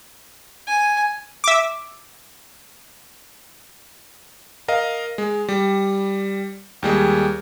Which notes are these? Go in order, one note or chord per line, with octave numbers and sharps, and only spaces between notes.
G#5
E5 D6
A#4 D#5 F5
G#3
G3
D#2 G3 G#3